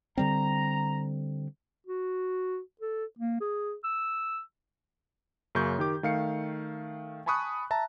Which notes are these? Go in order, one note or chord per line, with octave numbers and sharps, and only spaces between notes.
D3 G3 C4 A#5
F#4
A4
A#3
G#4
E6
F#2 C#3 A#3 C#6 G6
D#3 G4 D6
D#3 A3 F5 C7 C#7
G#5 A5 B5 C#6 D#6 F#6
E5 A5 A#5